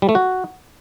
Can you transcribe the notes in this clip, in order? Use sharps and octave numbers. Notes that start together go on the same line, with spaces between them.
G3
A3
F#4